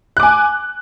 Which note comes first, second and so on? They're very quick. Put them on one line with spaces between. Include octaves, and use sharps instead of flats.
F#6 D6 G#5